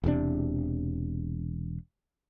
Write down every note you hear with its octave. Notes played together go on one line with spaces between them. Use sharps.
E1 E2 C3 D4